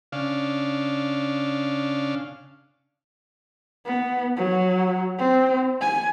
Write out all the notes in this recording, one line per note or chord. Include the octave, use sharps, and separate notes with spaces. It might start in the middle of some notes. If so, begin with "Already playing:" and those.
C#3 D4 F5
B3
F#3
C4
G#5